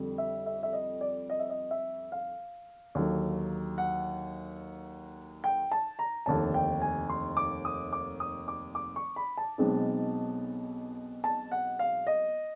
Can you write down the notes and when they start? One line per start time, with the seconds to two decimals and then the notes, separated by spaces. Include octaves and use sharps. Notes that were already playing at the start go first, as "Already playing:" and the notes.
Already playing: F2 D3 G3
0.18 E5
0.46 E5
0.63 E5
0.73 D#5
1.01 D5
1.30 D#5
1.39 E5
1.49 D#5
1.71 E5
2.12 F5
2.95 D#2 D3 F#3
3.78 F#5
5.44 G5
5.71 A5
5.99 A#5
6.26 F1 D#2 D3 A5
6.54 G5
6.82 G#5
7.10 C6
7.37 D6
7.65 D#6
7.93 D6
8.20 D#6
8.48 D6
8.75 D6
8.96 C#6
9.16 B5
9.37 A5
9.58 B1 B2 G#3 C4 D#4
11.24 A5
11.52 F#5
11.79 F5
12.07 D#5